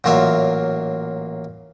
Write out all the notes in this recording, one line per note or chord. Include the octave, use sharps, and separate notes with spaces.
A1 A#2 F#3 F4 E5